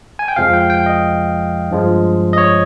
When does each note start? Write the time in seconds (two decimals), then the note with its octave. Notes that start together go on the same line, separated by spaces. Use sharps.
0.19 G#5
0.28 G5
0.36 F2 C3 F3 G#3 F5
0.53 G5
0.70 G5
0.86 D#5
1.71 G2 F3 G#3
2.33 D#5
2.38 C#5